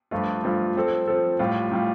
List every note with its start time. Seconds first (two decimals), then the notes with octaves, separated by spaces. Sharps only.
0.11 G2 F3 A3 F4
0.44 G2 F3 A3 F4
0.76 F3 C4 A4
1.08 F3 C4 A4
1.39 A2 G3 F4
1.71 A2 G3 F4